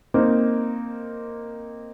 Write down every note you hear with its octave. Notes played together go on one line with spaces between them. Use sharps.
A#3 C4 D#4